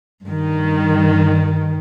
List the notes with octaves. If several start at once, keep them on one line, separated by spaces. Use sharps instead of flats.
G2 D#3